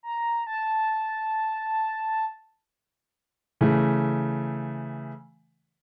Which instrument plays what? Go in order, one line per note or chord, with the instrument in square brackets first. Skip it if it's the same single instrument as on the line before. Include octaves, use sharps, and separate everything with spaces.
[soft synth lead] A#5
A5
[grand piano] C#3 E3 A3